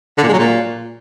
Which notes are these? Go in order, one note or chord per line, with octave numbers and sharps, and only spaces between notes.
D3
A#2
G#3
F#3
A#2